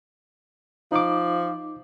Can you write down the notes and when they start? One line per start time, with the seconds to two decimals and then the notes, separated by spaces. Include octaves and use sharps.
0.92 F3 D#4 D6